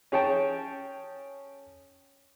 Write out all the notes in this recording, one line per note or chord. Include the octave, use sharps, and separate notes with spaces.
C#4 G#4 C#5 G5 A5